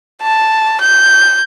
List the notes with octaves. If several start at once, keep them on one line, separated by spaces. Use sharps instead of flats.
A5
G6